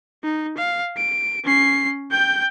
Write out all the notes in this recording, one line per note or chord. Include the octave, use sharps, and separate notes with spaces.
D#4
F5
D7
C#4 C7
G5 G6